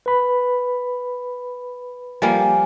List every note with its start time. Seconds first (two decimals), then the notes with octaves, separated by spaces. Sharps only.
0.06 B4 B5
2.22 F3 G3 A#3 G#5